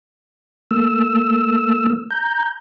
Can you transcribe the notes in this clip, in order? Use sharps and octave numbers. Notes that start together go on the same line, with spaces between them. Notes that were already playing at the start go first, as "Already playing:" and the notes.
A3 A#3 E6
A#5 G6